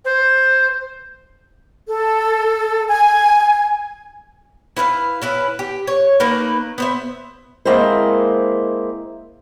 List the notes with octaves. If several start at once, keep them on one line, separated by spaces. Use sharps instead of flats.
C5
A4
G#5
E4 B4 E5 F5
C#4 E4 B4
G4
C#5
D#3 A3 A#3 B4
B3 C5 E5
G#3 A#3 C4 E4 C5